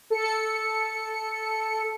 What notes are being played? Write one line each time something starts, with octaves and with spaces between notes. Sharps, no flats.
A4 C#7